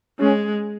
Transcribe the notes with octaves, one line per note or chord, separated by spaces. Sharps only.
G#3 C#4